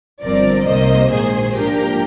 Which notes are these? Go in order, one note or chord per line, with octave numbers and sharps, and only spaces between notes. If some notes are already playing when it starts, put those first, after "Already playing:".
G1 G2 F3 C4 A#4 D5
C2 C3 D#3 A#3 C5 D#5
A#1 G#2 D#3 G#4 C5
G#2 F3 A#3 D4 G4 A#4